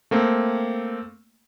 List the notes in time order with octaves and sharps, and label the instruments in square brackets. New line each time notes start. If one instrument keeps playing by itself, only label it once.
[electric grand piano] A3 A#3 C4